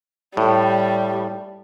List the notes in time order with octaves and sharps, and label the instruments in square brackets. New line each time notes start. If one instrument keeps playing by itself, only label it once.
[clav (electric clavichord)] A2 [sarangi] G3